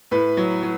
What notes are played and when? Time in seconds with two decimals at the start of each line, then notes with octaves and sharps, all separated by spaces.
0.11 A2 B4
0.37 F#3
0.63 F#3